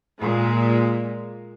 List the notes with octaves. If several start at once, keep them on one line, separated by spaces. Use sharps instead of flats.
A#2 G#3